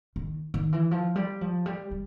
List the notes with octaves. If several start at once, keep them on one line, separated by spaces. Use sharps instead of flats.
D#3
D#3
E3
F3
G3
F3
G3
G3